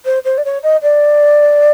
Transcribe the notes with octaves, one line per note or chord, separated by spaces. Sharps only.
C5
C5
D5
C#5
D#5
D5